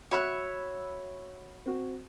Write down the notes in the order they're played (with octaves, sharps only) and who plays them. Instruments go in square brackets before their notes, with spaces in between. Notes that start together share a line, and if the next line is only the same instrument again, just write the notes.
[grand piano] F#4 B5 E6 [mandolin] C#5 E5 F#6
[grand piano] C4 F#4